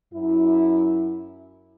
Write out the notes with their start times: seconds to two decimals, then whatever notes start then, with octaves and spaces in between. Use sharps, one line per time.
0.14 F#2 E4